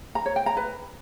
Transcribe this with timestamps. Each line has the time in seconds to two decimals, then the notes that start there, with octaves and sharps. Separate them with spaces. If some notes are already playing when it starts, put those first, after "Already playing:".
0.15 A#5
0.26 C#5
0.36 G5
0.46 A#5
0.57 B4